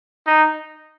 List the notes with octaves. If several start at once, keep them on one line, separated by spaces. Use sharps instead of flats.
D#4